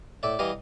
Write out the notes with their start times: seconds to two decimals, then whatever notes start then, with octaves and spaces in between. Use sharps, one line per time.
0.23 A2 D5 E5
0.39 E3 G3 D#5 F5